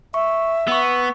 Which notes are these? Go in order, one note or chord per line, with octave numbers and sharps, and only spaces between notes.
E5 C#6
B3 C#6 E6